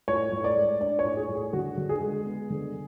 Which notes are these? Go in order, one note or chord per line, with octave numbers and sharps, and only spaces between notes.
A2 C#5
A2
D5
G#3
D4 D5
C#5
A2
G#4
A2
G#4
D3 F#4
D3
G#4
G#3
B3
D3